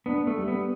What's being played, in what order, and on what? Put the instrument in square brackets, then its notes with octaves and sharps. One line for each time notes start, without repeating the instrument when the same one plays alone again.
[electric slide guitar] B3 [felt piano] D4
[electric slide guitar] A3
[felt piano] G3
[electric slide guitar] B3